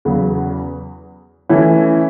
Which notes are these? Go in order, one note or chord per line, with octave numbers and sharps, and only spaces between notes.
E2 C#3 F#3 B3
E3 A3 C#4 E4